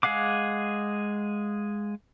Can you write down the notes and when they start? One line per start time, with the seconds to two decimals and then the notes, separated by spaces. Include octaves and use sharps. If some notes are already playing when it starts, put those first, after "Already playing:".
0.03 G#3 G#4 F5 F#5 D6